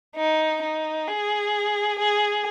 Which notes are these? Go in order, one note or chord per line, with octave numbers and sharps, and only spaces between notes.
D#4
D#4
G#4
G#4